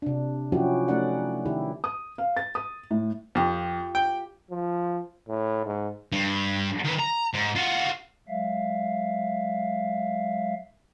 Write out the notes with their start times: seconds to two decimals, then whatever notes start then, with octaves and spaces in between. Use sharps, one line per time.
0.02 C3 D4
0.52 F3 F#3 C#4 E4 F#4 G4
0.88 A3 C#4 D#4 D5 F#5
1.46 D#3 E4 G4
1.84 D#6
2.18 F5
2.37 A6
2.55 D#6
2.91 A2
3.35 F2 F4 G4
3.95 G5
4.51 F3
5.28 A2
5.65 G#2
6.12 G2
6.85 D#3 B4
7.00 A#5
7.34 G#2
7.56 F4 F#4
8.28 F#3 G#3 E5 F5